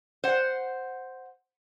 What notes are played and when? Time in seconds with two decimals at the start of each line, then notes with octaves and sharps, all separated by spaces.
0.24 C5 F#5